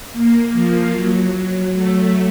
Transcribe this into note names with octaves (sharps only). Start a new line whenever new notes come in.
A#3
F3
F#3
A3